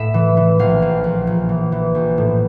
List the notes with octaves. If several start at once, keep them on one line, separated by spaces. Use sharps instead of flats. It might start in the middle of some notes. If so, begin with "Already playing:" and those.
Already playing: A2 E5
E3
E3
A#1 F5
A#1
A#1
A#1
E3
E3
A#1
A2